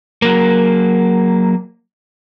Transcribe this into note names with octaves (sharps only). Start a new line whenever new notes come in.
F#3 A#3